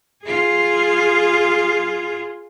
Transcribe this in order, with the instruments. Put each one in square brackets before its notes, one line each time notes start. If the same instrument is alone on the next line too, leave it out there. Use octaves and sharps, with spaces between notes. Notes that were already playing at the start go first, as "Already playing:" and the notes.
[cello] F4 G#4